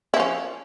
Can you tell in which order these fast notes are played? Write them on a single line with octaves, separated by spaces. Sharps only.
E4 F3 C#4